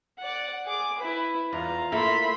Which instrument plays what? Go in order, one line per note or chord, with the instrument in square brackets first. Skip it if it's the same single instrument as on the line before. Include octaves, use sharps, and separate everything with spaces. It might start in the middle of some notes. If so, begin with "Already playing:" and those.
[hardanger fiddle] D5 F#5
G#4 D6
E4 B4
[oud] E2 [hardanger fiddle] F4 A#5
[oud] A3 A#3 E4 [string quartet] E5 B5 C6